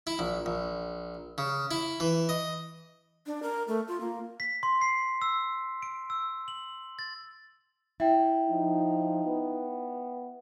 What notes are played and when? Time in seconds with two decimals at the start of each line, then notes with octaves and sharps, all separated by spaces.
0.07 E4
0.19 A#1
0.46 A#1
1.38 C#3
1.71 E4
2.00 E3
2.29 D#5
3.26 D4
3.43 A#4
3.68 A3
3.88 F4
4.00 A#3
4.40 B6
4.63 C6
4.81 C7
5.22 E6
5.82 D7
6.10 E6
6.48 F#7
6.99 A6
8.00 E4 E5 G5
8.50 F3 D#4
9.25 B3